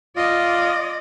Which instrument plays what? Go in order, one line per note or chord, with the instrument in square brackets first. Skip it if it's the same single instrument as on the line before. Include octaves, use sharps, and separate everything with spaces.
[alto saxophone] F4 [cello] D5 D#5